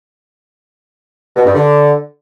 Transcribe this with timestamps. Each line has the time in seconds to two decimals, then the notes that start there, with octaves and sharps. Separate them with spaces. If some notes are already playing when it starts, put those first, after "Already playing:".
1.36 B2
1.46 G2
1.55 D3